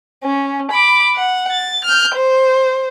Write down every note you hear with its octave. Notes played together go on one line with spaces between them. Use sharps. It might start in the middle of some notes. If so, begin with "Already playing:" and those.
C#4
B5 D6
F#5
A6
F6 G6
C5